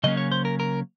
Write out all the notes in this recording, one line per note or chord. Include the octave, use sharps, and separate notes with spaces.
C#3 F#3 A#3 C#4 D#5
C#5
C5
A#4
A#4